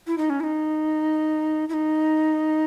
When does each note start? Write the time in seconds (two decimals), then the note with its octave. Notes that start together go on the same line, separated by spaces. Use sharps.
0.07 E4
0.18 D#4
0.30 C#4
0.40 E4
0.44 D#4
1.69 E4
1.74 D#4